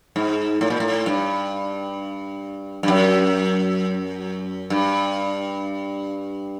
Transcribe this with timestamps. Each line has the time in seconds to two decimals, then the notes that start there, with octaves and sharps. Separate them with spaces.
0.16 G#2
0.61 A2
0.70 A#2
0.80 A2
1.06 G2
2.83 G2
2.88 F#2
4.70 G2